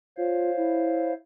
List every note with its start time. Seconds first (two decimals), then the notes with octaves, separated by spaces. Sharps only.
0.17 F4 C5 C#5 F5
0.57 E4